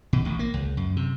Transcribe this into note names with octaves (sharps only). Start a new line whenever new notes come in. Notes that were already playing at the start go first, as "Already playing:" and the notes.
B2
A1
A#3
C#2
F#2
C3